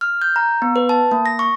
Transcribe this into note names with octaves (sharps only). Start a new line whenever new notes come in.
F6
G6
A#5
B3
B4
A5
A#3
A#6
C#6